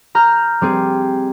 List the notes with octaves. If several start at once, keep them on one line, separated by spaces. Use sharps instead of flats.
A#5 F6 G6
G3 C4 G#4